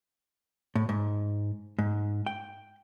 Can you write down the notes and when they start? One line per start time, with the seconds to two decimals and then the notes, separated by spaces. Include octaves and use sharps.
0.75 A2
0.89 G#2
1.79 G#2
2.26 G5